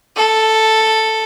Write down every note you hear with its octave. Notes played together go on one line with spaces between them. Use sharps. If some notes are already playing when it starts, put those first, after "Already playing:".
A4